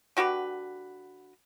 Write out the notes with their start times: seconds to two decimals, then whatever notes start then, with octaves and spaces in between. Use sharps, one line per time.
0.17 D3 F#4 G4 B4